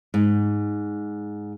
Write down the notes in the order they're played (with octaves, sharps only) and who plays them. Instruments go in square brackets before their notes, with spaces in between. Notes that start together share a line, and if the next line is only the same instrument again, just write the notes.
[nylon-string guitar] G#2